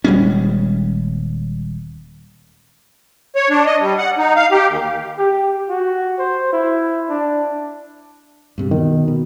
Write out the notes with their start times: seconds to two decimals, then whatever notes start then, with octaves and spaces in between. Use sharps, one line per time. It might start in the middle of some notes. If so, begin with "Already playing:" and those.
0.04 D#1 G3 G#3 C#4
3.36 C#5
3.50 D4
3.66 D#5
3.80 G3
3.98 F#5
4.18 D#4
4.36 F5
4.51 G4
4.68 D#2
5.18 G4
5.69 F#4
6.19 C5
6.53 E4
7.09 D4
8.58 G2 C3 G3
8.71 B2 D#3
9.08 B2